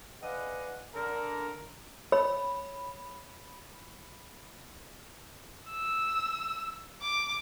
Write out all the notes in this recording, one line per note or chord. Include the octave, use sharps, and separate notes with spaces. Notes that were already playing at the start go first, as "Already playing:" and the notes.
G#4 B4 D5 D#5 F5 F#5
D3 A#4
C#5 B5
E6
D6